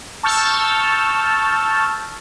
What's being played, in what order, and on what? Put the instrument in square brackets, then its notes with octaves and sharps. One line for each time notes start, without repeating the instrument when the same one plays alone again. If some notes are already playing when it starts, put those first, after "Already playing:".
[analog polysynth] A5 C#6 E6 F6 G6 A6